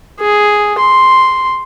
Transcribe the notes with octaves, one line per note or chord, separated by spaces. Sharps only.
G#4
C6